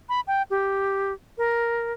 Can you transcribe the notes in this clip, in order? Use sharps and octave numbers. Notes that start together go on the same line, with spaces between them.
B5
G5
G4
A#4